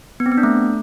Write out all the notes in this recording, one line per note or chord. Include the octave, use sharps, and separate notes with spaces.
B3
C4
B3
D4
A3